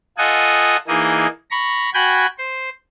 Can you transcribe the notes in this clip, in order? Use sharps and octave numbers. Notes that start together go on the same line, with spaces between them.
F4 A4 D#5 F#5 G#5 D#6
E3 A#3 D#4 G#4 D#5
A#5 B5 C#6
F#4 G5 G#5 B5 F#6 G6
C5